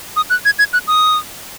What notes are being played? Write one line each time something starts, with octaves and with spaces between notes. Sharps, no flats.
D#6
F#6
G#6
G#6
F#6
D#6